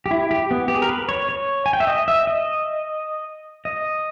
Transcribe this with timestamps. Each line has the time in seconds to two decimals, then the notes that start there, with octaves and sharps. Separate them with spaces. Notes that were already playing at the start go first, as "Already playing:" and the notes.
0.06 G4
0.11 E4
0.31 G4
0.51 B3
0.68 G4
0.75 G#4
0.82 A#4
0.89 B4
1.09 C#5
1.29 C#5
1.66 G#5
1.73 G5
1.80 E5
1.87 D#5
2.08 E5
2.27 D#5
3.65 D#5